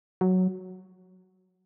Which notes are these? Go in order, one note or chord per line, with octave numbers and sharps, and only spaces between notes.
F#3